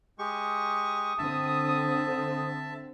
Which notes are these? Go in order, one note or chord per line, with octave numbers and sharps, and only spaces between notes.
G#3 G4 C#6 D#6
D3 C4 E5 A5